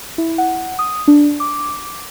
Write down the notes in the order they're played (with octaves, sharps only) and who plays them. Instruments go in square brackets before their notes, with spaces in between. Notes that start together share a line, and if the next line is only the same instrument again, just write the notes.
[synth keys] E4
F#5
D#6
D4
D6